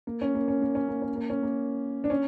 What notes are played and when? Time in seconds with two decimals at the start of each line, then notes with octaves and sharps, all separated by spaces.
0.07 A#3
0.21 C#4
0.35 A#3
0.48 C#4
0.62 A#3
0.75 C#4
0.89 A#3
1.02 C#4
1.16 A#3
1.30 C#4
1.43 A#3
2.04 D4
2.10 C#4